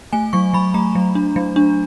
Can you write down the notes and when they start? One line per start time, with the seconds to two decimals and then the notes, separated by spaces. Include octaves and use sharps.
0.13 A3 G#5
0.33 F#3 C#6
0.53 F#3 B5
0.74 A3 A#5
0.95 F#3
1.15 D4
1.36 F#3
1.56 D4